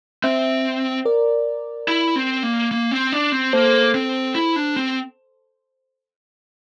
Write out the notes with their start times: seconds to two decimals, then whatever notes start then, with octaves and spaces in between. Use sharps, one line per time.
0.24 C4 C5 E5
1.05 A#4 D5
1.88 E4
2.16 C4
2.43 A#3
2.71 A#3
2.91 C4
3.13 D4
3.32 C4
3.53 A#3 A4 C5
3.95 C4
4.35 E4
4.56 D4
4.76 C4